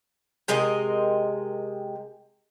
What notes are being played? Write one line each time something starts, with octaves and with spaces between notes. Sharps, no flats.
C3 G#3 A#4 D#5